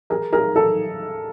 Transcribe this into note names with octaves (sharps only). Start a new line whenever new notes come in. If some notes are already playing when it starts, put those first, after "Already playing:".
G#4 A#4
G#4 A#4
A4